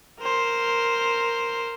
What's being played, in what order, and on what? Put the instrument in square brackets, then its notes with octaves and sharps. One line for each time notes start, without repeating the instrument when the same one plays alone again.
[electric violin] A#4 C5